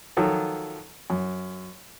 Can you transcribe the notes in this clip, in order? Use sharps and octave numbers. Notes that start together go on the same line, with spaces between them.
D#3 F3 F#3 F4 A4
F#2